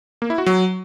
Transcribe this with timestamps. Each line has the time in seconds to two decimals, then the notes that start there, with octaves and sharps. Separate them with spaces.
0.22 A#3
0.30 E4
0.38 F#4
0.46 F#3